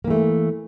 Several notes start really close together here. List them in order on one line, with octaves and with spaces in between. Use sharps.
A#3 E3 A3